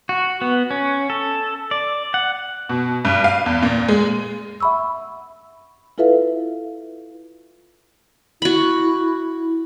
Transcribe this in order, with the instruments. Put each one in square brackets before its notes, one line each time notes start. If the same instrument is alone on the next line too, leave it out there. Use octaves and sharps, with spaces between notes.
[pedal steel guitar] F#4
B3
C#4
A4
D5
F#5
[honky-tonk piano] B2
G2
F5
E2
A#2
G#3
[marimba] E5 F#5 B5 C#6 E6
E4 F4 A4 B4 E5 F5
[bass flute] E4 [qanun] F#4 B5